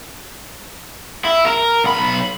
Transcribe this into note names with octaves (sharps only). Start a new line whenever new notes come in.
E4
A#4
B1 B5